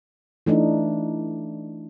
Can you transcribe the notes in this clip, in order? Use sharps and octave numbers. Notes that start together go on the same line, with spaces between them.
E3 A3 D4 D#4